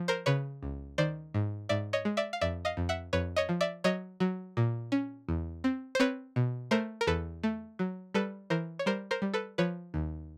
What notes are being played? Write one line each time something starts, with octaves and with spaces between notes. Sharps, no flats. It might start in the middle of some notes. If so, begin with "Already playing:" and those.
Already playing: F3
A#4 C5
C#3 B4 C#5
C#2
D#3 C5 D5
G#2
G#2 D5 E5
C#5 D#5
G#3
D5 E5
F5
F2 D5 E5
D#5 F5
F2
E5 F#5
F2 B4 C#5
C#5 D#5
F3
D5 E5
F#3 C#5 D#5
F#3
A#2
C#4
E2
C4
C5
C4 B4 C#5
B2
A3 A#4 C5
A#4
E2 A4 B4
A3
F#3
G3 A4 B4
E3 A#4 C5
C#5
G3 A#4 C5
A#4 C5
G3
A4 B4
F3 B4 C#5
D#2